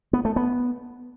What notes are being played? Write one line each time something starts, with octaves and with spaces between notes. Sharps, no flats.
B3
A3
B3